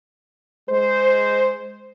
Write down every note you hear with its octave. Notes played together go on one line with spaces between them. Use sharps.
G#3 C5